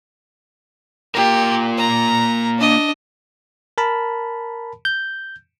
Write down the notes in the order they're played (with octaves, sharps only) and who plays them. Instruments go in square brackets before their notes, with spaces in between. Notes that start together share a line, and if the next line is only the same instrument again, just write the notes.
[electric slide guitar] A#3 F4 A#4 [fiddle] G4
[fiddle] A#5
D4 D#5
[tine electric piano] A#4 A5 B5
G6